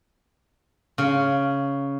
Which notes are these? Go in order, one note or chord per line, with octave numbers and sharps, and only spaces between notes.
C#3